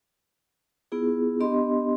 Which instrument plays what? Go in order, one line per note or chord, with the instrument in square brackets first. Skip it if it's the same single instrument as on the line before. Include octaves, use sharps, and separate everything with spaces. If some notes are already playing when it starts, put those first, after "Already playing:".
[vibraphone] B3 E4 F4 G#4
B3 D4 G4 D#5 C6